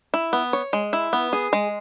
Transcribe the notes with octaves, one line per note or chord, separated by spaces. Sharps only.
E4
B3
C#5
G#3
E4
B3
G#4
G#3